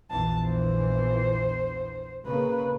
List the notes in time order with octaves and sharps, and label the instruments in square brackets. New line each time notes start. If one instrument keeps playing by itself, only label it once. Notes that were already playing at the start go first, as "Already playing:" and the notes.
[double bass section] A#1 E2 E3 [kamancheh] A5
[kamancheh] C5
[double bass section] C#3 A#3 [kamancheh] B4